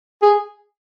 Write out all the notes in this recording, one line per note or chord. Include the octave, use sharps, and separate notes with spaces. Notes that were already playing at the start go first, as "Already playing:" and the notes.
G#4